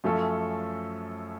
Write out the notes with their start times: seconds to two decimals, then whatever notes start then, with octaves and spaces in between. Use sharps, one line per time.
0.04 F#2 F3 A3 C#4 A4